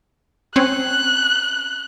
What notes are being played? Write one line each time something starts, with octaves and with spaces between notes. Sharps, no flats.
C4 C#4 F#6